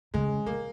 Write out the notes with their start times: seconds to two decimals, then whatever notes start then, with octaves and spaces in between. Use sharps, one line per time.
0.14 C#3 G#3
0.46 B2 A#3